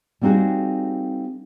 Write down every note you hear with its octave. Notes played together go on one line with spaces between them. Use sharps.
G3 A#3 C4 D#4 F#4 G#4